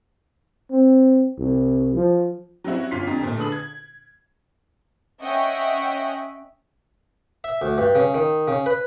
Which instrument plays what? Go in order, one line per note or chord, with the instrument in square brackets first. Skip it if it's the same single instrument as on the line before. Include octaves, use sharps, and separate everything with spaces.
[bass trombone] C4
C2
F3
[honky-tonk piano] F#3 G3 C4 C#4 E4 F#4
G1 C#4 F4 C6 B6 C7
F2 D3 G3 D4 D#4 A#5
A#2 A3
D3 G#4 A4 B4 D#6 F#7
G#6
[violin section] C#4 D#5 E5 F#5 G5 C#6
[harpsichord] E5
D2
G2
C#3
D#3
C#3
B4